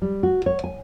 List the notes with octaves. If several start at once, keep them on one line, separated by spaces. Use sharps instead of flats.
G3
F#4
C#5
G#5